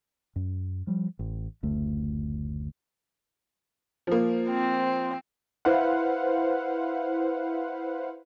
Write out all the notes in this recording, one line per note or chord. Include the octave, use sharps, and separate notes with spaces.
F#2
F3 G3
A1
F#1 D2 A3
F3 A#3
C4
E4 B4 C5 F5 F#5